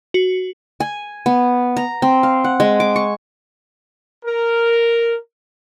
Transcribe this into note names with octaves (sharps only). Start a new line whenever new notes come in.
F#4
G#5
B3
A#5
C4
F5
F#5
G#3
D6
C#6
A#4